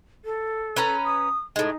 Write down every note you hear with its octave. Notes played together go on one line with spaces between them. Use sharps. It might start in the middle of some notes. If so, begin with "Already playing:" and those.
A4
C#4 B4 A#5
D#6
A2 G#3 D#4